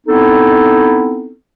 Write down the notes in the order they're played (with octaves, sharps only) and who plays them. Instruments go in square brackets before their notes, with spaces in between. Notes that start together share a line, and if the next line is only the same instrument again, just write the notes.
[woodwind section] B3 C4 D#4 E4 A4